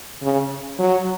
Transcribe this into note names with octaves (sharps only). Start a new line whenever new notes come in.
C#3
F#3